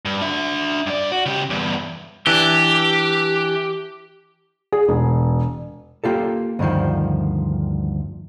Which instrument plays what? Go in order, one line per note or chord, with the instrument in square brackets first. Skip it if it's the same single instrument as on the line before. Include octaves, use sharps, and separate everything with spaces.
[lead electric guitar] G2
D4 E5
G2 D5
F#4
C#3 G4
E2 G2
[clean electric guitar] E3 D4 [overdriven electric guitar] G4
[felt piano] G#4
E1
[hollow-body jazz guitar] A#3 F4 G4 A4
D2 G2 B2 D#3 F3